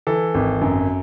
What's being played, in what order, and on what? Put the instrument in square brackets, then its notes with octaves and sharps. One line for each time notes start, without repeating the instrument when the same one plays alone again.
[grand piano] E3 A4
G#1
F#2